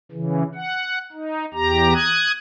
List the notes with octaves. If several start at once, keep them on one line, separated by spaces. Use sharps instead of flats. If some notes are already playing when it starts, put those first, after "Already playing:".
C#3 E3
F#5
D#4
E2 G4 A#5
D#6 F#6 G#6